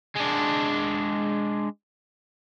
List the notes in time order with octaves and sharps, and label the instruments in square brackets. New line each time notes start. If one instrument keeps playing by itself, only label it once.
[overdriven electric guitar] G#3 D4